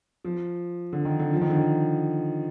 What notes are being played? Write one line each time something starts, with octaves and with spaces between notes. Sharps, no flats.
F3
D3
D#3
D3
F3
D#3
D3
D#3